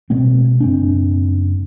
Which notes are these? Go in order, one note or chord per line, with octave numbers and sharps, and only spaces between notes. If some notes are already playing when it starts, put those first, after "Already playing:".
B2 G#3 C4
F#1 C4 D4